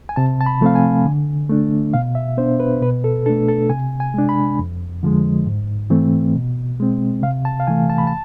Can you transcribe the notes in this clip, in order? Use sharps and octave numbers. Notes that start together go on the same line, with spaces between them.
G#5
C3 A5
A5
B5
F3 A3 C4 F5
G#5
D3
A3 D4
B2 F5
E5
B3 D4 C5
B4
B2 B4
A4
A3 D4 A4
A4
C3 G#5
G#5
G#3 D4
B5
F2
D3 F3 G#3
G#2
E3 A3 C4
B2
G#3 C4
C3 F5
A5
F5
E3 A3 G#5
A5
B5
A5